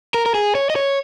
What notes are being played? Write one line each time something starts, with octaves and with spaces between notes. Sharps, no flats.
A#4
A#4
G#4
C#5
D#5
C#5